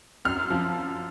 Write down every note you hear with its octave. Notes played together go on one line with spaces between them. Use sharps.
F#2 F6
F3